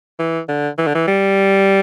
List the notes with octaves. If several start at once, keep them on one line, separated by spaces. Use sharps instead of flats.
E3
D3
E3
D3
E3
G3